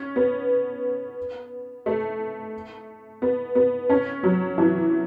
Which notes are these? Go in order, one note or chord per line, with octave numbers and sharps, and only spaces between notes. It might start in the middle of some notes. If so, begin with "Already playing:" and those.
Already playing: C#4
B3
A3
B3
B3
C#4
F#3
E3